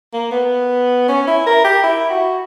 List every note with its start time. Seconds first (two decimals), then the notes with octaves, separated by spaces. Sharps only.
0.13 A#3
0.32 B3
1.08 C#4
1.27 E4
1.46 A#4
1.64 G4
1.83 E4
2.10 F#4